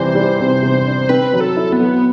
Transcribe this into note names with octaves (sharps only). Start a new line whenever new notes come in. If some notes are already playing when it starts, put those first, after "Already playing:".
Already playing: C3 E3 G3 C5
G3
C3
C3
D4
C4 B4
F#3
A4
E4
B3
F#3